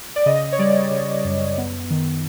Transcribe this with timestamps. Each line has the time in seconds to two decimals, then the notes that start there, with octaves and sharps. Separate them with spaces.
0.16 D5
0.26 C#3 D#5
0.52 C#5
0.59 G3 D5
0.91 C#3
1.25 F#2
1.58 B3
1.90 D#3